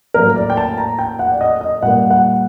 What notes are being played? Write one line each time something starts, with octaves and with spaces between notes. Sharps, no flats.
A2 F#3 A#3 A#4
D5
G5
A5
A#5
G5
F#5
D5
D#5
D#5
A#2 G3 A#3 F#5
F#5